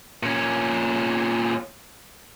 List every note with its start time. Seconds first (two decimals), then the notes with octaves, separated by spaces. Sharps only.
0.23 A#2 C#4